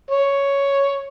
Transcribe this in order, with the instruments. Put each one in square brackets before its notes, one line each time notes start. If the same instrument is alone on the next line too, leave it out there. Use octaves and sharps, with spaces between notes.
[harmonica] C#5